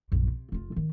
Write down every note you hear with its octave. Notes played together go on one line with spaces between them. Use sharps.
A#1 F#2
C3
F1 F4
D#3